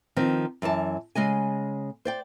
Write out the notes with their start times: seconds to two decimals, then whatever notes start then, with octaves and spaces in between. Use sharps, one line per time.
0.16 D#3 F3 C4
0.62 F#2 E3 D5 A5
1.15 C#3 G#3 D#5 G#5
2.05 C5 D5 G5